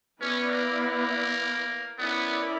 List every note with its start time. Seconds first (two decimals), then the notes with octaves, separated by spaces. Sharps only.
0.21 B3 C#4 E4 B4 D5
0.50 A#3
0.80 A#3
1.98 B3 C#4 E4 A#4 D5